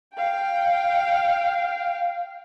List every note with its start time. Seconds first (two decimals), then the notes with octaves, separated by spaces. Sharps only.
0.14 F5 G5